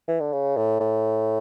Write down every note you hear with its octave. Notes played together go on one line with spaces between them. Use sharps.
E3
D3
C#3
A2
A2